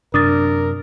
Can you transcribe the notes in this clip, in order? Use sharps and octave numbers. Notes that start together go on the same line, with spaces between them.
F#2 C3 D4 A#4 D#6 A6